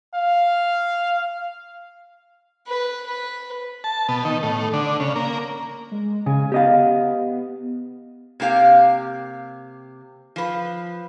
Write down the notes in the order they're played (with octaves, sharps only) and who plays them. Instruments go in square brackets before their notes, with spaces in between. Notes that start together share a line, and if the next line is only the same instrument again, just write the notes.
[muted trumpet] F5
[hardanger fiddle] B4
B4
[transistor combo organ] A5
B2
D#3
A2
D3
C#3
A#3
[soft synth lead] G#3
[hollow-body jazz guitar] C#3 [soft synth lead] G#5
[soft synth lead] B3 [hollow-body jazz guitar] G4 D#5 F5
[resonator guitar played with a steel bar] C3 A#3 G4 F5
F3 B4